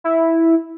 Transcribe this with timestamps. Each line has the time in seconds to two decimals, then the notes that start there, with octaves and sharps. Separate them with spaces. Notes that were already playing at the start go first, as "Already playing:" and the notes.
0.04 E4